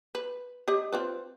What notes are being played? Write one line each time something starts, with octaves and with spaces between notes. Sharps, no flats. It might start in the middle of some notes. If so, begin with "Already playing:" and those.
B4
G4 D5 D#5
C4 F4 B4